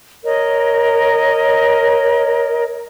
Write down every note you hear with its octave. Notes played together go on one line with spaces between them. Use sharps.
A#4 C#5 D#5